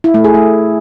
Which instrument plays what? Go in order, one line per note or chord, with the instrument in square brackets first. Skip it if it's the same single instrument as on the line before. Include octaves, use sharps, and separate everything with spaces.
[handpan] E4
A3
G#4
A3